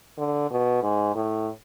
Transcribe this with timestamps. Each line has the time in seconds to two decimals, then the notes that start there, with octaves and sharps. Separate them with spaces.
0.18 D3
0.51 B2
0.83 G#2
1.15 A2